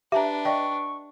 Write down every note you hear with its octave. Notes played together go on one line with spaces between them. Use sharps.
D4 G4 B4 E5 A5 A#5
D5 D#5 G5 C#6